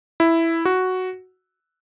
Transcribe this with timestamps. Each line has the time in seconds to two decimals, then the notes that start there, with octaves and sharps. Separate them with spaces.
0.20 E4
0.65 F#4